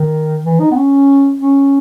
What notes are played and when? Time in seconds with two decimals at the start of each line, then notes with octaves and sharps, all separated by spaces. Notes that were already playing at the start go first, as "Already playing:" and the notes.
Already playing: D#3
0.45 E3
0.60 D#4
0.71 B3
0.77 C#4
1.40 C#4